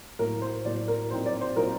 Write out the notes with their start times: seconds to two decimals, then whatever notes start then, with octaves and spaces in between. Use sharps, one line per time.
0.19 A2 F#3 A#3 A#4
0.42 C5
0.65 A2 F#3 A#3 D5
0.88 A#4
1.10 A#2 F#3 C4 D#4 C5
1.26 D5
1.41 C5
1.56 A#2 F#3 C4 D#4 A#4